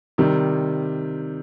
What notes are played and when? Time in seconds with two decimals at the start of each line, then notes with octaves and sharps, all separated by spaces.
0.18 C3 D#3 G3